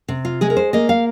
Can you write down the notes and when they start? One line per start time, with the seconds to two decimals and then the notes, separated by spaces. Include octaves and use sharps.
0.08 C3
0.25 F4
0.41 G#3 G#4
0.50 A#4
0.57 C5
0.73 A#3 D#5
0.89 F5